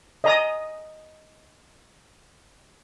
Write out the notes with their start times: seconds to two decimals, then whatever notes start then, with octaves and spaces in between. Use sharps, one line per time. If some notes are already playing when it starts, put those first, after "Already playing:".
0.24 D#5 A#5 D#6